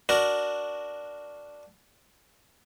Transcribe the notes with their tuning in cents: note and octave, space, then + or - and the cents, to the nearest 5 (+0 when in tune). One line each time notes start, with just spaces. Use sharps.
D4 +0 F#4 +0 A#4 +0